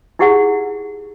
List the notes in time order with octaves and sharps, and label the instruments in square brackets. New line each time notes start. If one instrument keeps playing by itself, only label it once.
[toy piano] D#4 E4 G4 G#4 F#5